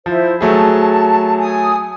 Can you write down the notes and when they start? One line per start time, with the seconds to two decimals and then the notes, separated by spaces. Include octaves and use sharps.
0.06 F3 E4 C5
0.41 F#3 A3 G#4 A5
1.39 G#5 D#6